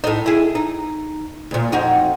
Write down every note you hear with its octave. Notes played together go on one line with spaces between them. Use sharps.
A2 D#4
E4 G#4
D#4
D2 A#2
F2 D#4 F#4